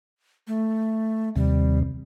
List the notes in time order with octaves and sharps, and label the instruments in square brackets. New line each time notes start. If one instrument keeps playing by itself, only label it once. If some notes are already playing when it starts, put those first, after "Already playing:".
[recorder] A3
[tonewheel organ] D#2 C3 [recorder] G3